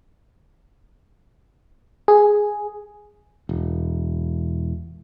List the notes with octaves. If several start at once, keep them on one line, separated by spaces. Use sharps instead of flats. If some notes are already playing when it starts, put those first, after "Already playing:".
G#4
E1